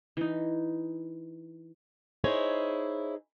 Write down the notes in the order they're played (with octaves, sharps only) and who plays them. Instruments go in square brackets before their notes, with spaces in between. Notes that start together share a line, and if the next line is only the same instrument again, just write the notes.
[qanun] E3 D#4
[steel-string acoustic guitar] D#4 E4 G#4 C5 C#5